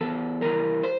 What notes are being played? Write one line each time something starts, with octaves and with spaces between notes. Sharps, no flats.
E2 A4
E3 G3 A#4
C5